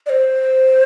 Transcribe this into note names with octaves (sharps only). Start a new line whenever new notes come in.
D5
C5